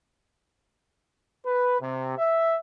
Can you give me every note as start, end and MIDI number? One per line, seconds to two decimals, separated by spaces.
1.46 1.80 71
1.81 2.15 48
2.18 2.56 76